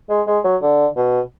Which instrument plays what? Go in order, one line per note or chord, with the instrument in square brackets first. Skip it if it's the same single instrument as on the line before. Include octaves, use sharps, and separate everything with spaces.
[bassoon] G#3
G#3
F#3
D3
B2